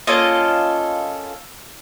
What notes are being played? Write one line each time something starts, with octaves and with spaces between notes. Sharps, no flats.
A#3 C#4 F4 A4 D#5